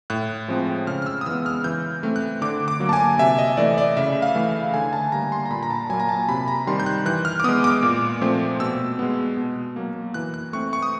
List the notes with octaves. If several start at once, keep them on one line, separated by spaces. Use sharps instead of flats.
A2 F#6
F3 G#3 C4
C#3 F6
F6
E6
D#6
E3 G#3 B3 E6
F6
E3 G6
A3 C4
F#6
D3 D6
D6
F#3 A#3
A5
G#5
C3 E5
D#5
E3 A3 D5
D5
C#3 E5
F5
E3 A3
D3 G#5
A5
G3 A#3 A#5
C6
A#5
A#2 B5
A#5
A5
F#3 A#3 G#5
A#5
A5
C3 B5
A#5
D#3 G3 C4 C6
G6
F#6
E3 F#6
F6
D6
G#3 B3 D#6
D6
A#2
F3 A3 C4
B2 E6
G#3 B3
B2
F#3 A#3
E3 F#6
F#6
A3 C4 C#6
C#6
D#6